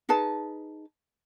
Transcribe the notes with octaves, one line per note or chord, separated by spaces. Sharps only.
D#4 G#4 B4 A5